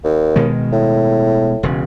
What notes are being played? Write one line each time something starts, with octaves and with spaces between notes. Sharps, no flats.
D#2
B2 D#3 G#3
A2
E1 C#3